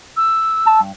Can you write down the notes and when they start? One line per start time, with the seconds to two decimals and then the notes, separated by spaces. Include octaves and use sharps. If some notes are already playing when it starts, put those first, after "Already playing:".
0.17 E6
0.66 A5
0.80 G2